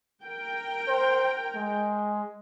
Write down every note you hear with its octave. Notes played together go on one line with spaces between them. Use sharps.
A#4 G5
C5
G#3